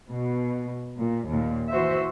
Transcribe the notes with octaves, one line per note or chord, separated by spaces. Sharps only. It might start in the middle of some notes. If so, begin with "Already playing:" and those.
B2
A#2
D#2 A#2
E3 F#4 C5 E5